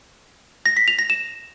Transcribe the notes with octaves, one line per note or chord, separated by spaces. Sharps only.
A#6
B6
F7
A#6
E7